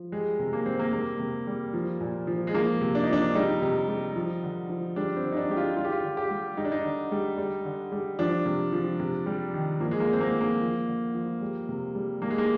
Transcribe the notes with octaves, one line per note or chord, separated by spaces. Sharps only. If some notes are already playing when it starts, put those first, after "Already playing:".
Already playing: F3
G3 G#3
C3
A#3
G3 C4
A#3
G3 A#3
C3
G3
F3
A#2
F3
G#3
F3 A#3
C3
D4
D#4
F3 D4
G3 D#4
C3
G3
F3
D3
F3
G3 D4
C4
D3
D#4
D4
G3 G4
F4
G3 F4
G4
F4
D3
G4
G3
G3 D#4
D4
D#4
D3
G3
G3
D3
G3
F3 D4
C3
F3
C3
G3
D#3
F3 A#3
G#3
A#3
D3
C4
A#3
F3
A#3
F3
D3
F3
G3
C3
G3
G3 A#3
G#3
A#3